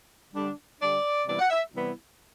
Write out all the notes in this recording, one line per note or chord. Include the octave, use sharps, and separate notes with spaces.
D3 G3 D4
D3 G3 D4 D5
C3 E3 G3 B3 E4 D5
F#5
E5
C3 E3 G3 B3 E4